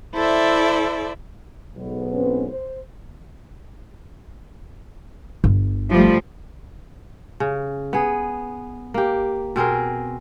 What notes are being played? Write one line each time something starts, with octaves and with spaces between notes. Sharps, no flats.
E4 A4 C5 D5 E5
B1 G#2 B3
C4 C#4 B4
C5
G1
F3 G3 A3
C#3
B3 G#4
A#3 G4
B2 C4 G#4 A#4